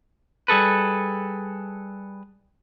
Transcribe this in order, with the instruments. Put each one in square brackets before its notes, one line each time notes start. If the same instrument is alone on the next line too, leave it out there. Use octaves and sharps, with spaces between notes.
[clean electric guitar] G3 G#4 A4 B4